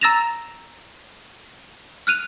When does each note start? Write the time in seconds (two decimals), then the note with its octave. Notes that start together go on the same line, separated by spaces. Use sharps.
0.01 A#5 E6 A6 A#6 E7 F7
2.07 F6 F#6 D#7 F7